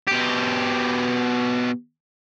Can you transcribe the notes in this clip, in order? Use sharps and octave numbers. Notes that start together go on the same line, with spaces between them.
B2 G4